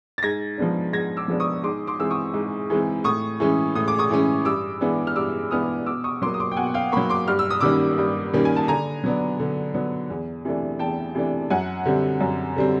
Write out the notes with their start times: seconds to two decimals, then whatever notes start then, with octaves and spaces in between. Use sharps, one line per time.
0.18 A6
0.23 G#2 G#6 A#6
0.58 F3 G#3 B3 D4
0.93 G#2 G#6 A#6
1.17 D6 E6
1.28 F3 G#3 B3 D4
1.40 C#6 D#6
1.63 G#2 C6 D6
1.87 C6 D6
1.99 E3 G#3 C4 E6
2.11 C#6 D#6
2.34 G#2
2.70 E3 G#3 C4
3.04 A2 C#6 D#6
3.40 E3 G#3 C#4
3.75 A2 D#6
3.88 D6
3.98 C#6 D#6
4.10 E3 G#3 C#4
4.45 G2 D6 E6
4.81 E3 G#3 B3 D4
5.07 F6
5.16 G2 D6 E6
5.51 E3 G#3 B3 D4 D#6 F6
5.86 B2 D6 E6
6.04 C#6 D#6
6.22 F#3 A#3 C6 D6
6.34 D#6
6.40 C6 D6
6.51 G5
6.57 B2 F#5 G#5
6.74 F5 G5
6.92 F#3 A#3 B5 C#6
7.09 C6 D6
7.28 G2 F6
7.39 E6
7.51 D#6
7.61 D#3 G3 A#3 C#4 D6 E6
7.98 G2
8.33 D#3 G3 A#3 C#4
8.45 G#5
8.56 A5
8.68 D3 G#5 A#5
9.04 F#3 B3 D4
9.40 D3
9.74 F#3 B3 D4
10.10 E2
10.45 C3 E3 A3 D4
10.79 E2 G5 A5
11.15 C3 E3 A3 D4
11.50 F#2 F#5 G#5
11.86 D3 G3 C4
12.21 F#2
12.56 D3 G3 C4